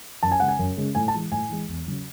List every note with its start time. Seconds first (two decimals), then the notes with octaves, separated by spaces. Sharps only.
0.23 F#2 A5
0.32 G#5
0.40 C#3 G#3 F#5
0.48 G#5
0.59 F#2
0.77 C#3 G#3
0.95 A2 G#5
1.08 A5
1.14 E3 G#3
1.32 A2 G#5
1.49 E3 G#3
1.68 E2
1.87 C#3 F#3